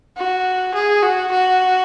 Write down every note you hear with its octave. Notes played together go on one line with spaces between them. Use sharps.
F#4
G#4
F#4
F#4